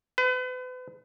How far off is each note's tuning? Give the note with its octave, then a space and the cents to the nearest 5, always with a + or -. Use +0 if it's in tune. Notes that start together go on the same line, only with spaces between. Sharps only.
B4 +40